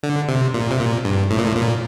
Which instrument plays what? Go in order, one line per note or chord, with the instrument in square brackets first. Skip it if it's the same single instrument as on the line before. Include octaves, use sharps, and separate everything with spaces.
[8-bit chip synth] D3
C3
A#2
C3
A#2
G2
A2
A#2
A2
A#2